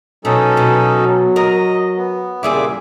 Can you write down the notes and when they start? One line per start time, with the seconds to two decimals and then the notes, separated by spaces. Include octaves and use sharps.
0.25 B2 F#3 C#4 D#4 A4
0.57 B2
1.36 A#4 D#5
1.97 B3
2.43 E2 A#2 C#3 G3 G#4 E5 D6